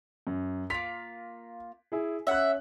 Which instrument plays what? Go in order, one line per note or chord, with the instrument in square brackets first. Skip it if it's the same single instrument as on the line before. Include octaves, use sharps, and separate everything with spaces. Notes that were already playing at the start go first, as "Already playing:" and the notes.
[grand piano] F#2
[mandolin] A#3 F4 [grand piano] B6
[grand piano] E4 G#4
[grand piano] C#4 F#6 [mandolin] E5 F#5